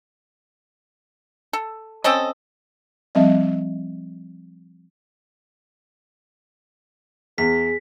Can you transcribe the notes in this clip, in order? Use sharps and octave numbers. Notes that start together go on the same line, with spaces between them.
A4
C4 C#4 A4 D#5
F3 G3 C4 D#5 E5
E2 G#4 B6